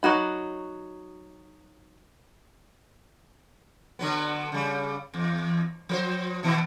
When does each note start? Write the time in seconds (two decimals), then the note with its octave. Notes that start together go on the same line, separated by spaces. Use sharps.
0.03 F#3 D#4 F#4 B5
3.99 D3 F#3 B3
4.52 C#3 G3
5.14 E2
5.89 F3 A#4 C5
6.43 B2 D#3 B3